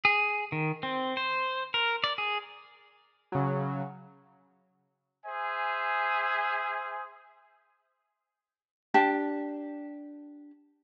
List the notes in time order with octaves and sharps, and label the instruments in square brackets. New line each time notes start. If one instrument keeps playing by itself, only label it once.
[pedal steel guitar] G#4
D#3
C4
C5
A#4
D5
G#4
[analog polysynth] C#3 F#3
[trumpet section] G#4 C5 E5 G#5
[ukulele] D4 G4 A5